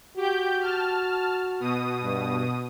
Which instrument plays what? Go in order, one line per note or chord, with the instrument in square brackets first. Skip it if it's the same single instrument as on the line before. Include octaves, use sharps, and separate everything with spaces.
[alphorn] F#4 [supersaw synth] G4 G6
[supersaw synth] A5 F6
B2 D#6
[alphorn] G2